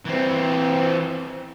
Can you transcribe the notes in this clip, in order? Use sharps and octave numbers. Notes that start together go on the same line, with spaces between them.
E3 C4